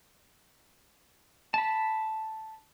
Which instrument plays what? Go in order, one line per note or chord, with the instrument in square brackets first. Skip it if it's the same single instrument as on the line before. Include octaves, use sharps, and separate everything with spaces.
[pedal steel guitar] A5 B5